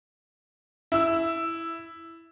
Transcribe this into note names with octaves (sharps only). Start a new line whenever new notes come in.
E4 E6